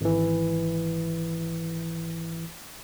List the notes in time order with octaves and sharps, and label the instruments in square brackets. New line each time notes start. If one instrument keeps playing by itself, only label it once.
[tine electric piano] G#1 E3